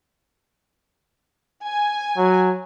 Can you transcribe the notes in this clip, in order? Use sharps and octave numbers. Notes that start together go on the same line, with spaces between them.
G#5
F#3